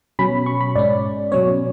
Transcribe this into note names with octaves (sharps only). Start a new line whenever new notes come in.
B2 F#3 C#4 B5
C#6
B5
G#2 G#3 C#4 D5
B2 F#3 C#4 C#5